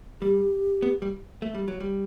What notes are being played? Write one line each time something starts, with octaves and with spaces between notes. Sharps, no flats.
G3 G4
B3
G3
A3
G3
F#3
G3